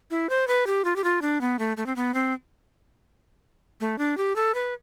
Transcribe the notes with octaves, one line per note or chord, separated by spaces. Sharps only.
E4
C5
B4
G4
F4
G4
F4
D4
B3
A3
A3
C4
B3
C4
A3
D4
G4
A4
B4